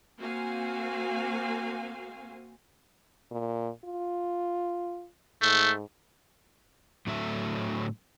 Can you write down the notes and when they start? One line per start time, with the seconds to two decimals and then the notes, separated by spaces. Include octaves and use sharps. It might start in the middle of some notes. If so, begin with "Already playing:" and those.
0.18 A#3 C4 F#4 C5 F5 G#5
3.32 A#2
3.85 F4
5.42 G#2 A3
7.07 A2 D3 F#3 A3 E5